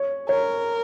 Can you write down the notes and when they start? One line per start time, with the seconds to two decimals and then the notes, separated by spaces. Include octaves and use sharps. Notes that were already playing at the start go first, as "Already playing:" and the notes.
Already playing: C#5
0.29 A#4 C#5